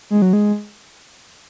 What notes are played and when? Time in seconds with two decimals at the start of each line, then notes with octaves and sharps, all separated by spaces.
0.10 G#3
0.22 F#3
0.33 G#3